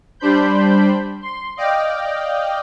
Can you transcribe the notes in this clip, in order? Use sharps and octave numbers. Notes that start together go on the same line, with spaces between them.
G3 D4 C5 B5 G6
C6
D5 D#5 F5 G5